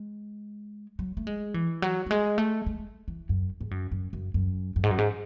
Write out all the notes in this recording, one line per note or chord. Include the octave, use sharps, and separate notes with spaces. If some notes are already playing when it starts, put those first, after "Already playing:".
Already playing: G#3
F#3
A3
G#3
E3
F#3
F#3
G#3
A3
G#3
E3
F#2
G#2
F#2
F#2
F#2
F#2
F#2
G#2
F#2
G#2